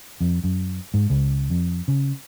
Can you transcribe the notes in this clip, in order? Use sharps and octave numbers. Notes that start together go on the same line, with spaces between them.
F2
F#2
G#2
C#2
F2
C#3